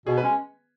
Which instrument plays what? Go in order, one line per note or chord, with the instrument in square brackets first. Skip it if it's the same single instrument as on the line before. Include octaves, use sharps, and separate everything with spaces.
[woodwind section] B2 [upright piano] G#4
[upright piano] B4
[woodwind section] G#3 C#4